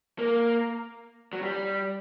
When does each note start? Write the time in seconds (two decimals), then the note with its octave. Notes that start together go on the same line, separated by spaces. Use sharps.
0.18 A#3
1.33 F#3
1.42 G3